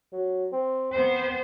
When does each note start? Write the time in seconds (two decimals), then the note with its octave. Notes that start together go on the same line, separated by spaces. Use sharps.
0.12 F#3
0.52 C4
0.92 B3 C4 C5